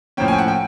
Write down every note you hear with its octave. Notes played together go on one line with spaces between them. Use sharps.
A2 F3 A#3 C#4 G5
G#5
G5
F#5
G5